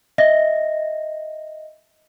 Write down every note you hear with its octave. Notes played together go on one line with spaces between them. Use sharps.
D#5 E5 A#6